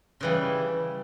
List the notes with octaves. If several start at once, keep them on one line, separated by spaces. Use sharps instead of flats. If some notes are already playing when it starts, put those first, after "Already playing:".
C#3 E3 G3